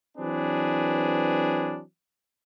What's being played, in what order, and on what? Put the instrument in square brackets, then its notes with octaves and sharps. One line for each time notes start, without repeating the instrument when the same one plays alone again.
[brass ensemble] E3 F#3 C4 D4 G#4 B4